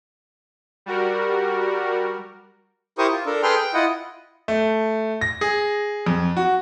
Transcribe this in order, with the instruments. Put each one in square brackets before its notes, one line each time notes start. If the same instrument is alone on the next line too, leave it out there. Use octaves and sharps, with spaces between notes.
[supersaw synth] G3 F#4 A#4
[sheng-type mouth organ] E4 G4 A#4 C5 C#6 D#6
F4
D4 A4 A#4
G#4 A4 B4 G5 C6 F6
G5
E4 F4 D#5 F#5
[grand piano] A3
A#6
G#4
F2
F#4